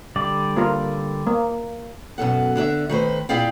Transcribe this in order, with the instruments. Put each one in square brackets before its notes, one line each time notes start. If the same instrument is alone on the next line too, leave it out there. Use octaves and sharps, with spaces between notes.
[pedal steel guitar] D3 G3 D5
[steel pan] A#3 F4 A#4
A#3
[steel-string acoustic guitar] F#2 B2 A4 F#5
D3 D4 D5 E5
D#3 A3 B4 C5
A#2 E4 G#4 D5 F5 G5